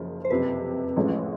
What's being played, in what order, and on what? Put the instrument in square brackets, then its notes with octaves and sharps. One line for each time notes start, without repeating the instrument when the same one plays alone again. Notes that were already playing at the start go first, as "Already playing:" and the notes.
Already playing: [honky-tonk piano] F#1 F#2 C#3 F3
[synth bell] C5
[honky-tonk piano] F#1 F2 C3 [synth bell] B4
[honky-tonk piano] A1 A2 F3 G#3 C#4